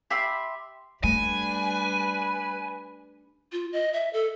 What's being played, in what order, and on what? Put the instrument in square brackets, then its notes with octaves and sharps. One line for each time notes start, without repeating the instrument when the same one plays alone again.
[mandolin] G4 E5 B5 C6
[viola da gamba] G3 D4 [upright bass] A3 [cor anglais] B4 [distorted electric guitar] G#5
[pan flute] F4
D#5
E5
A4